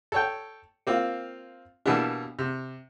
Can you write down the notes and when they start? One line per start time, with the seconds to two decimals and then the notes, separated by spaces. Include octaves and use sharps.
0.12 A4 C#5 G5
0.87 A#3 C4 F4
1.86 B2 E3 G3 A#3 B3 D4
2.39 C3